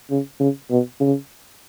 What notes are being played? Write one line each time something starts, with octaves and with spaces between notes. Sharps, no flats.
C#3
C#3
B2
C#3